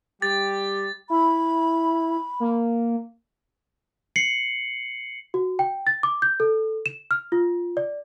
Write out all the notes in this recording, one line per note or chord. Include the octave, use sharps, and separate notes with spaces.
G3 G4 A6
E4 B5
A#3
C7 C#7 F#7
F#4
G5
A6
D6
G6
A4
E7
F6
F4
D5